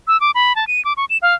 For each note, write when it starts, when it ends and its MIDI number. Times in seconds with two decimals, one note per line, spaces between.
0.08 0.20 88
0.21 0.31 86
0.35 0.55 83
0.56 0.67 81
0.67 0.83 99
0.85 0.93 86
0.97 1.05 85
1.10 1.18 100
1.22 1.34 77